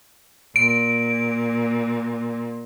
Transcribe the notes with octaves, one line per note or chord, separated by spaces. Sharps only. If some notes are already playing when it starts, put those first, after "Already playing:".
A#2 D7